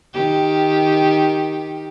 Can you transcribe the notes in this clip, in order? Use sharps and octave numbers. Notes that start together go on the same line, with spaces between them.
D#3 G4